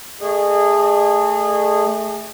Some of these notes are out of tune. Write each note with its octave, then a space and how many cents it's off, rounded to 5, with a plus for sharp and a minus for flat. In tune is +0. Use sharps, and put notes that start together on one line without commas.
A3 +0 G#4 -20 D#5 -45